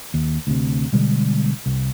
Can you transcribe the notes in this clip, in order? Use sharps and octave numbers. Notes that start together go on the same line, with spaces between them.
D#2
D2 C3
B2 D3 G3 G#3
C2